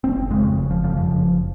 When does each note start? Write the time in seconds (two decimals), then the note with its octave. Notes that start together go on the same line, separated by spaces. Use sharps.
0.04 F#1 C4
0.30 F2 C#3 G#3
0.57 F#1
0.71 F3
0.84 F2 C#3 F3
0.97 F3
1.11 F#1